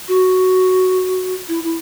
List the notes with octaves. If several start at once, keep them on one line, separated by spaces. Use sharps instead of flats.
F#4
E4
E4